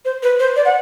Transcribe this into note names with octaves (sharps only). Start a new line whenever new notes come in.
C5
B4
C5
D5
F#5